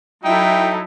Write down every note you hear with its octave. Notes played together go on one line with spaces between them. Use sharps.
F#3 D#4 E4 A4 E5 G5